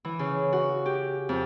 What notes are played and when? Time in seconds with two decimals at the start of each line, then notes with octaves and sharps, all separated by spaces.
0.05 E3
0.19 C#3
0.53 F#4
0.86 G4
1.29 F2